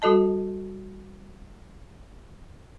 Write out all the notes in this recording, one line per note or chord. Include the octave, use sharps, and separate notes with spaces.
G3 F#4 A4 D#5 A5